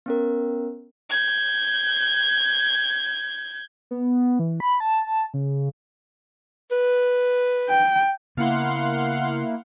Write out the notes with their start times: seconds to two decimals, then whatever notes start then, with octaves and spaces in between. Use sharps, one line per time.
0.06 B3 C#4 A#4
1.10 G6 G#6
3.91 B3
4.39 E3
4.60 B5
4.80 A5
5.34 C#3
6.72 B4
7.70 G5
8.37 C#3 A#3 B3 E4 F5 F#5 C6